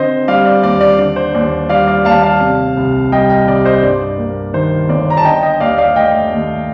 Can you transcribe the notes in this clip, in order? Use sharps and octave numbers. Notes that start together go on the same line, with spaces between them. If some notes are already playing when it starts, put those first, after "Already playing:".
Already playing: D3 C4 C5 D#5
G3 D5 F5
D5
D#2 D5
D5
D3 D5
C5
D#2 D5
G3 D5 F5
D5 F5
D#2 F5 A5
F5 A5
C3
C2
G3 D#5 G5
D#5 G5
C2 D5
C5 D#5
G2 D5
A#3
D#3 C5
G1 D5
A#5
A5
D3 D#5 G5
D#5 G5
D#2 D5 F5
D5 F5
A3 D#5 G5
D#2